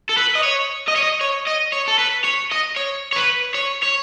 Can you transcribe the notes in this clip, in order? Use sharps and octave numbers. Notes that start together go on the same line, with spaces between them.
A4
B4
D#5
C#5
D#5
C#5
D#5
C#5
D#5
C#5
A4
B4
C#5
D#5
C#5
C#5
B4
C#5
C#5